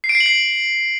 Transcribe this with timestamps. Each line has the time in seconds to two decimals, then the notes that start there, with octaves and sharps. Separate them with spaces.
0.04 C7
0.09 D7
0.15 C7
0.20 F#7
0.26 C7